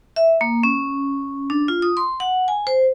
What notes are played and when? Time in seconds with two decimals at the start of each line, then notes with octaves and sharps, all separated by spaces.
0.16 E5
0.41 A#3
0.63 C#4
1.50 D4
1.68 F4
1.82 D#6
1.97 C6
2.20 F#5
2.48 G#5
2.67 C5